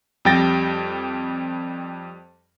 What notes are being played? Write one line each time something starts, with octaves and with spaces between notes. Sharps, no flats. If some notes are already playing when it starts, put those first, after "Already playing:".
F2 G3 G5 A6 A#6